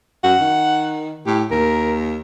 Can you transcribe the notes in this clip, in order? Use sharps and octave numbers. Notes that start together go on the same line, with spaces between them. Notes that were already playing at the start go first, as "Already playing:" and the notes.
F#2 F#5
D#3
A2 G4
D#2 A#4